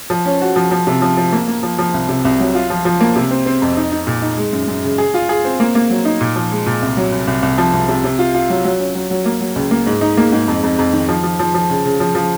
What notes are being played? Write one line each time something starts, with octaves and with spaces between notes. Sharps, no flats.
F3
C#4
F#4
F3
F3
C3
F3
F3
A#3
A#3
F3
F3
C2
C3
C2
F#3
F4
F3
F3
A#3
C3
C4
C4
F2
D#4
D#4
A#2
D#4
G#3
F#2
F#2
C#3
G#4
F4
G#4
C4
A#3
A#3
F#3
D#4
A#2
F3
G#3
A#2
C2
F#3
C2
C2
C2
F3
C2
C3
C3
F4
F4
F#3
F#3
C#4
F#3
F#3
A#3
F#3
C#2
A#3
G#2
D#4
A#3
G#2
F2
F2
F2
D#3
F3
F3
F3
F3
C#3
C#3
F3
F3